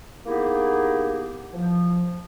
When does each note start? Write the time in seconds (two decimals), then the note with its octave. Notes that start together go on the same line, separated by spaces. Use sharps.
0.26 A#3 B3 D#4 E4 G4 G#4
1.54 F3